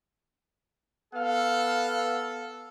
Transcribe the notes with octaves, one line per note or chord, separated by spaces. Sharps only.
B3 A4 F5